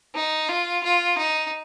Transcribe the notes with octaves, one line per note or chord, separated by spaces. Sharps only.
D#4
F4
F4
D#4